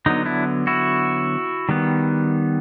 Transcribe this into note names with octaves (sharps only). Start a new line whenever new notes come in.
D3 F#3 B3 D#4
D4 E4
E4 F#4
D#3 G3 B3